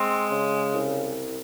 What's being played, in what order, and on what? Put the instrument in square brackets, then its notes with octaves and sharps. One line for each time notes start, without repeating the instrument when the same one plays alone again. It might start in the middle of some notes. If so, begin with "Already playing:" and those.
Already playing: [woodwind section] G#3 C4
C#3
C2